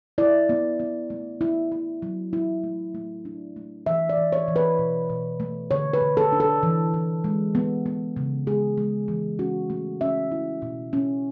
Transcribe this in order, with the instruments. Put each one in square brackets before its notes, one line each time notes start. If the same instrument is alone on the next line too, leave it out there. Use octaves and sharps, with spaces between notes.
[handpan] E4 D5
B3
B3
A3
E4
E4
F#3
E4
A3
A3
D4
A3
E3 E5
D5
E3
C#5
E3
B4
B2
B2
A3
D3 C#5
B4
D3
A4
D4
A4
E3
E3
G#3
B3
B3
C#3
G#3 G#4
G#3
E3
C#4 F#4
A3
C#4 E5
E4
B2
C#4